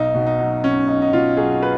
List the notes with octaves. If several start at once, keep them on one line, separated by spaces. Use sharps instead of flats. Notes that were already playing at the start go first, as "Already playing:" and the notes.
Already playing: B1 D#4
B2
D#4
F#3
B1 C#4
B1 D#4
D#4
B2 F4
F#3 G#4
B4